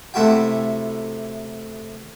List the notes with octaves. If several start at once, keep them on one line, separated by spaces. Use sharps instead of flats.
C3 A3 E4 F#4 G5